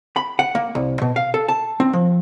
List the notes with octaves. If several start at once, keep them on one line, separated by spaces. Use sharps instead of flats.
B5
F#5
A#3
C2
B2
F5
A4
A5
C4
F3